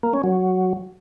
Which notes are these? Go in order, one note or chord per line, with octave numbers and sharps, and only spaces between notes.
A#3
C#4
F#3